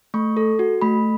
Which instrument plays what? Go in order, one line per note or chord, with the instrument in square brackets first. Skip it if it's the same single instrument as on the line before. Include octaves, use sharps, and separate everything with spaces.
[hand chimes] A3 C#6
A4
F#4
A3 B5